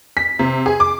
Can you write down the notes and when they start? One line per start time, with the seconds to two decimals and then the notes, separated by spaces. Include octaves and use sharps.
0.17 B6
0.39 C3
0.66 G#4
0.80 D6